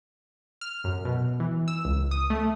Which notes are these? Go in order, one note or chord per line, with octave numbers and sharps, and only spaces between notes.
F6
F#2
B2
E3
E6
C#2
D#6
A3